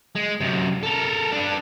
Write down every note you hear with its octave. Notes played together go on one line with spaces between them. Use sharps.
G#3
F#2 C3
A4 A#4
D4 B4